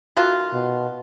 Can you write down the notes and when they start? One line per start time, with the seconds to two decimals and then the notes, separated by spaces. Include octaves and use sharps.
0.17 D#3 A3 F4 F#4 F#6
0.53 B2